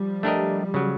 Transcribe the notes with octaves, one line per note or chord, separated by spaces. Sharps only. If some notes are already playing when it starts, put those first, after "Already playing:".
Already playing: F3 G3
A3 D4 G4 A#4 D#5
C#3 F#3